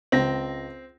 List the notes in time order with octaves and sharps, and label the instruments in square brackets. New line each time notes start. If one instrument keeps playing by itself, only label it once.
[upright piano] C#2 A#6 [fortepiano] C4